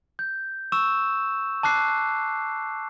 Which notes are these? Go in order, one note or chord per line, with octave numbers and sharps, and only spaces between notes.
G6
C#6 E6 E7
A5 D6 F#6 C7